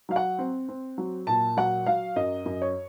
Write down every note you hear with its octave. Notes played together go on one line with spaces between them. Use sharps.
F#3 F5
F#5
C4
C4
F#3
A#2 A5
F#3 F#5
F#3 F5
F#2 D#5
F#2
C#5